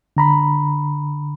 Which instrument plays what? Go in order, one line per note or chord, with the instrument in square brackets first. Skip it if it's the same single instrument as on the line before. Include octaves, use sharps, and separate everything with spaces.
[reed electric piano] D3 A#5 B5